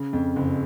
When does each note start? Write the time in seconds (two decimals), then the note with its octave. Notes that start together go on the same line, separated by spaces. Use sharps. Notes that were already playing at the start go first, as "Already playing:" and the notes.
Already playing: C#3
0.13 F2
0.36 F#1